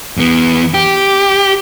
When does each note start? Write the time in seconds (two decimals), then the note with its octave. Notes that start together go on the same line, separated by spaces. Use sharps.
0.17 E2 B3
0.74 G4